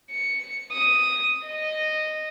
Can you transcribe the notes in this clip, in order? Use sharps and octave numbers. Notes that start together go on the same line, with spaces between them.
C#7
D#6
D#5